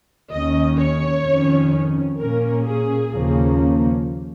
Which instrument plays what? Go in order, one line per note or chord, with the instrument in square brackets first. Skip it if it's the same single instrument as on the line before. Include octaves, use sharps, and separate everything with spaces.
[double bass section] D#2 D#3 C#4 [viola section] D#5
[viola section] C#5
[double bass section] F2 D#3 C#4
[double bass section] A#2 A#3 C#4 [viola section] A#4
[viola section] G#4
[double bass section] D#2 C#3 F3 A#3 C#4